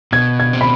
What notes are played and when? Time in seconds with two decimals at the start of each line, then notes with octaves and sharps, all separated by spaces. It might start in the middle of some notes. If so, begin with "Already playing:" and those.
0.12 B2 G#6
0.40 G#6
0.53 C4
0.61 B5